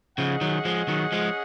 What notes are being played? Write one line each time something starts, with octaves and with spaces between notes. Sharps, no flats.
C#3 F3 C#4 G#4 D#5 F#5
D#3 F#3
F3 G#3
D#3 F#3
F3 G#3